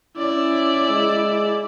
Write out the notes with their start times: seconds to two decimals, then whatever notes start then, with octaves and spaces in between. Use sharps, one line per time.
0.18 C#4 E4 D5
0.89 G#3